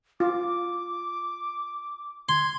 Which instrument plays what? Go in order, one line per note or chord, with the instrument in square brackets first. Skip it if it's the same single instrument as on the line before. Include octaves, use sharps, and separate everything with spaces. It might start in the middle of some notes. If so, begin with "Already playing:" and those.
[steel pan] F4 [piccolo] D6
[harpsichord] C6 [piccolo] G#6